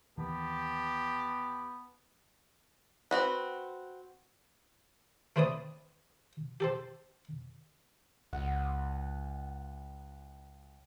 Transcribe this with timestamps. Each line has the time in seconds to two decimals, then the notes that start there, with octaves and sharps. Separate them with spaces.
0.18 D#2 E3 A#3 B3 G4 A5
3.11 C4 F#4 B4
5.36 A3 C4 B4 C#5 D5 D#6
6.60 G4 A4 C5
8.33 C#2 F#5